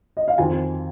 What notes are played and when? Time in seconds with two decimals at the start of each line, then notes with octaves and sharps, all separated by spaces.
0.17 D#5
0.28 F5
0.38 F2 D#3 C4 G#5